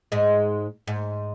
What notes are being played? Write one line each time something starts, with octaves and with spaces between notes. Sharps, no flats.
G#2 G#3
G#2